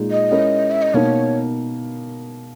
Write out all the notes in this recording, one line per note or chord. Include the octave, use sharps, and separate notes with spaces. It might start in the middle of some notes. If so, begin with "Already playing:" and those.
Already playing: A#2 G#3 D#4 G#4
D#5
G#3 C#4 E4 A#4
E5
D#5
B2 A#3 D#4 C#5